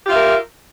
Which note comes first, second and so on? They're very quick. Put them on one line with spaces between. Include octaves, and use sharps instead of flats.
G4 F4 E5 A#4